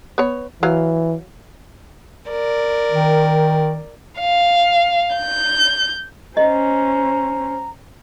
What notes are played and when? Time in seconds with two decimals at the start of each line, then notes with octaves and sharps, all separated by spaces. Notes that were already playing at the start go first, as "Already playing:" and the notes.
0.18 B3 C#5
0.63 E3 F#3 F5
2.29 A#4 D5
2.92 D#3
4.20 F5
5.16 G6
6.37 C#4 C5 D#5 A#5